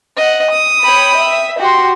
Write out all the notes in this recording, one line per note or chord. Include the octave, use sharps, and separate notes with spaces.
D#5 F#5
D#6
C#5 G5 B5
E5
F#4 G4 C6